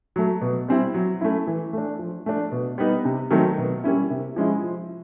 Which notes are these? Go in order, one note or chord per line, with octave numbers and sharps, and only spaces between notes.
F#3 A3
B2
G3 C4 E4
F#3
A3 C#4 E4
E3
A3 D4
F3
A3 D4
B2
G3 B3 D#4
C3
D#3 F#3 A3 C4
B2
G3 A#3 C#4 E4
C3
F3 G#3 C#4 E4
F3